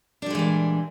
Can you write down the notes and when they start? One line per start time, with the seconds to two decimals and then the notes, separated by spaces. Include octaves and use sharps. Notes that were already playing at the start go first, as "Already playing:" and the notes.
0.22 D4
0.26 G3
0.30 G#3
0.35 E3
0.39 A#2